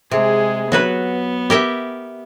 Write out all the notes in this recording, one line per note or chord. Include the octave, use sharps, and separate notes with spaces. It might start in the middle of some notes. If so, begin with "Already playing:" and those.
C3 G#3 G#4
F#3 B3 F#4 B4
G4 A#4 E5